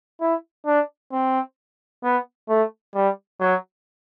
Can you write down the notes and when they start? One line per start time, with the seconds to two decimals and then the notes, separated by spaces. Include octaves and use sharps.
0.21 E4
0.66 D4
1.12 C4
2.03 B3
2.49 A3
2.95 G3
3.40 F#3